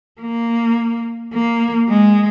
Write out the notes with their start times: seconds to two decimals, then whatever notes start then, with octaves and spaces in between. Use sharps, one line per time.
0.22 A#3
1.34 A#3
1.89 G#3